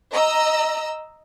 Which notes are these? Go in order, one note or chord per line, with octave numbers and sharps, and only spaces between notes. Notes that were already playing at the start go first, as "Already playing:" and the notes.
D#5 A#5 E6